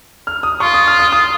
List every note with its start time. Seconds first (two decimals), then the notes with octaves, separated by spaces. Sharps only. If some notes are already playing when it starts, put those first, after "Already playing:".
0.27 F6
0.43 D#6
0.60 F4 C#6
0.74 D#6
0.88 F6
0.99 D#6
1.12 D#6